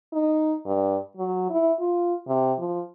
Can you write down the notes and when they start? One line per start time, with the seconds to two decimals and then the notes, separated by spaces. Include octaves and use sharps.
0.13 D#4
0.66 G2
1.17 F#3
1.50 E4
1.79 F4
2.27 C3
2.58 F3